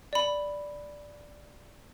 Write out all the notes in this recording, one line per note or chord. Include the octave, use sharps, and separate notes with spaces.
D5 B5